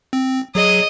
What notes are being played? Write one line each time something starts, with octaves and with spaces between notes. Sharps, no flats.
C4
F#3 G#4 D#5